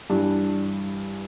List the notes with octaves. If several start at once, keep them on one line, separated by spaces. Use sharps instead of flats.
G2 E3 G3 D4